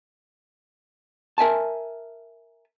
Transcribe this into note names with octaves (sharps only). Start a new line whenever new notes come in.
A#4 E5 G#5 A5